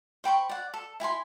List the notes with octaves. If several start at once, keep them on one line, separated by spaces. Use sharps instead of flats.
C5 G5 B5 C#6
D5 F#5
A4
E4 G#5 B5 C6